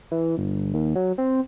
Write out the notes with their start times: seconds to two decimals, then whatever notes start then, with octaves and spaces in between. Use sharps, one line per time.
0.11 E3
0.38 G1
0.74 D#2
0.96 F#3
1.18 C4